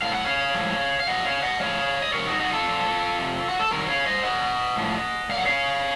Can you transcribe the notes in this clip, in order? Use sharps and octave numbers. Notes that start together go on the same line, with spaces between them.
A2 F#3 F5
F#5
C#5 F5
A2 F3
F5
A#2 F3 D#5 F#5
C#5 F5
D#5 F#5
A2 F3 C#5 F5
D#5
C3 F3 A#4 C#5
D#4 F#4
D#4 F#4
F4 A4
A#2 F3
C3 F3
F#4
A4
C3 D#3 F#3 F#4 A#4
C#5 F5
C5 D#5
A#2 F#3 D#5 F#5
A2 F3
A#2 F#3 F5 F#5
C#5 F5